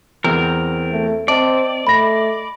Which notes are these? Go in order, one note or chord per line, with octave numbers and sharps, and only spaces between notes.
E2 C4 A#4
A3
C4 D5 D#5 A5
A3 B5 A#6